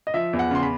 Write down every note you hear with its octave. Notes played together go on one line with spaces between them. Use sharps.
D#5
F3 E5
E2
F#5
C#3 C6
B5